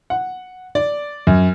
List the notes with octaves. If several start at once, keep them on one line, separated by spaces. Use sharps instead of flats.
F#5
D5
F#2